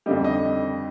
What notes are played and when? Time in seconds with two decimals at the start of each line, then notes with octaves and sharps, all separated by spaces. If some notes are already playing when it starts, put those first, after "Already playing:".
0.06 F2 D3 G3 D#5
0.24 D#5